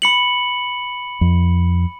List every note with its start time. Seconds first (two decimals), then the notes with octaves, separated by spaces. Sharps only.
0.02 B5 C#7 F#7
1.21 F2